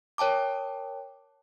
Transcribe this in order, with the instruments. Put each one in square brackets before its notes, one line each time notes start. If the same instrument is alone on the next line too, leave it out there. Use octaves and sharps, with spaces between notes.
[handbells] A#4 C#5 G5 A5 D6